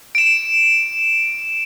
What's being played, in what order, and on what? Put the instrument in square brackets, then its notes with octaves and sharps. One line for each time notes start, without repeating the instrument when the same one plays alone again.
[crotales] D7 E7